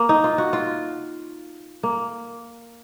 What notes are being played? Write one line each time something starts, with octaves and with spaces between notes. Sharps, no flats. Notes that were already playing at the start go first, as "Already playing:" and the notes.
Already playing: A#3
D#4
F4
F#4
F4
A#3